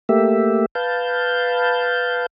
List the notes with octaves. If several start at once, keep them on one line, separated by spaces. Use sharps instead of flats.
A3 A#3 G4 E5
B4 F5 A5 G6